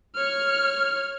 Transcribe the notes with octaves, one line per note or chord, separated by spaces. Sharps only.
C#5 F6